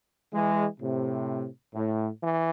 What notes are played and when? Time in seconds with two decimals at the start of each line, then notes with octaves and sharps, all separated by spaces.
0.33 E3 G#3
0.81 A2 C3
1.75 A2
2.22 E3